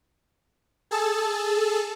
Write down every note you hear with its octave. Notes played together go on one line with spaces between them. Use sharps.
G#4 A4 A5